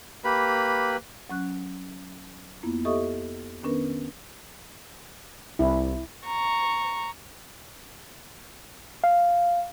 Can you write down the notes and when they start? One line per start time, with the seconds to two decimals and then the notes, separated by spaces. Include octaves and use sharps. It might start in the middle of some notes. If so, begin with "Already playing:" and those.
0.24 A#3 G4 B4 B5
1.29 F#3 C#4 F#6
2.63 F2 A#3 B3 E4
2.85 G4 A4 D#5 E5 C#6 D#6
3.63 D#3 B3 C#4 D4 A#4 B4
5.59 C2 E4
6.26 A#5 C#6
9.03 F5